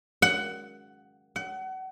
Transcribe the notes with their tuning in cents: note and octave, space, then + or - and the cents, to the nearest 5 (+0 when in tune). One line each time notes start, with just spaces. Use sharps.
F#5 +15
F#5 +30